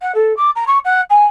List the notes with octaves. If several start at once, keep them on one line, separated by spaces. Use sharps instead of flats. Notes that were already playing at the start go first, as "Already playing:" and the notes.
F#5
A4
D6
A#5
C#6
F#5
G#5